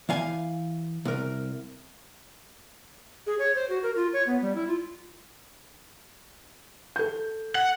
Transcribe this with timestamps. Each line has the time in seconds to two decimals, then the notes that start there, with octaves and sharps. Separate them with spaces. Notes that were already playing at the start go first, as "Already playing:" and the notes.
0.09 E3 F5 G#5
1.05 C2 A#4
3.27 G#4
3.39 C#5
3.55 C5
3.69 F#4
3.83 A#4
3.96 F4
4.13 C#5
4.26 B3
4.42 G3
4.55 E4
4.68 F4
6.96 A4 G6
7.55 F#5